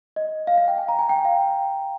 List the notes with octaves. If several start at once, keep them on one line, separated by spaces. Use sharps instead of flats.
D#5
F5
F5
G5
G#5
A#5
G#5
G5
F5